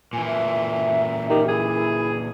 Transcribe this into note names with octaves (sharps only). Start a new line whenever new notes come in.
A#2 E3 G#5
E5
D#3 G4
E4 G#4